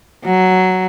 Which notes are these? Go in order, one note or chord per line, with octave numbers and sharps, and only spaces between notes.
F#3